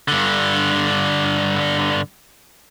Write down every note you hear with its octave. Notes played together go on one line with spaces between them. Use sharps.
G2 D3